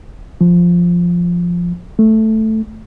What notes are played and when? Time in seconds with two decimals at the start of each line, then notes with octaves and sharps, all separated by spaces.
0.41 F3
1.99 A3